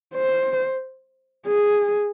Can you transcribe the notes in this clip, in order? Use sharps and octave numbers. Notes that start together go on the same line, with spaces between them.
C5
G#4